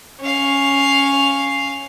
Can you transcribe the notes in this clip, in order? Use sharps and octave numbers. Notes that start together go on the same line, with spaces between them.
C#4 F5